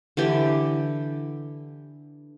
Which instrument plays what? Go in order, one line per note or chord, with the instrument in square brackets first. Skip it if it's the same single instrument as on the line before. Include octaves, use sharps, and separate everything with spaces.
[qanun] D3 E3 G4